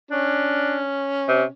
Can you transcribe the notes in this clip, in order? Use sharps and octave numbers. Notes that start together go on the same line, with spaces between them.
C#4 D4
C3